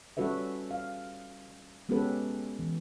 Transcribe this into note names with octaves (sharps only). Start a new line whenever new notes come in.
G3 C#4 F#4 A4 B4 E5
F5
G#3 B3 C#4 G4 A4 B4
E3